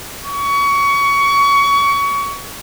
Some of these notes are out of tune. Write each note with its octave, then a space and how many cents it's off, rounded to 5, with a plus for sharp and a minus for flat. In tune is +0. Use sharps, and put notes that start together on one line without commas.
C#6 +25